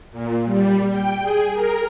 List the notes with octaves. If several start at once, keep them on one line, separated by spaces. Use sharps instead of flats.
A#2
G3
G5
G#4
A#4